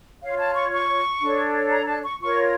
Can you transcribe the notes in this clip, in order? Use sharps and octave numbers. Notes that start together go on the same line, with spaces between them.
F4 C#5 F5
A5
C#6
C#6
D4 A4 C#5
A#5
A5
C#6
F4 A#4 C#5 C#6